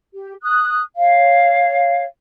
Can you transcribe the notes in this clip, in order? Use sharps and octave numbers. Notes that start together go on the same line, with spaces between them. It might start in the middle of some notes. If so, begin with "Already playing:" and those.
G4
D#6 F#6
C#5 F5